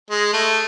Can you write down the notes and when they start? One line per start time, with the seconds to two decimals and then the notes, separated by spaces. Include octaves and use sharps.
0.11 G#3
0.33 A3